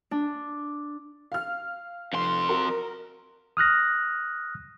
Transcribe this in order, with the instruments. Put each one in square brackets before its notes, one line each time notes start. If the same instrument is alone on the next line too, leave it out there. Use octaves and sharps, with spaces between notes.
[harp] D4
[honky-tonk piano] F5 F6
[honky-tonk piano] F1 [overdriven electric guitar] F2 C6
[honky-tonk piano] F#4 A#4
[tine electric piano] D#6 F6 F#6 A#6